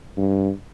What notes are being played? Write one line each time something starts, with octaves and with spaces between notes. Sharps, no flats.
G2